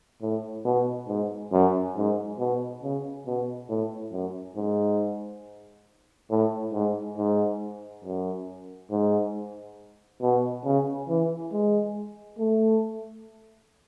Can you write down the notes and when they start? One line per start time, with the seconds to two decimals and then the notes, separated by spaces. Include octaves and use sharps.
0.22 A2
0.65 B2
1.08 G#2
1.52 F#2
1.96 G#2
2.38 B2
2.83 C#3
3.26 B2
3.69 A2
4.12 F#2
4.55 G#2
6.31 A2
6.73 G#2
7.17 G#2
8.04 F#2
8.90 G#2
10.21 B2
10.65 C#3
11.09 E3
11.52 G#3
12.39 A3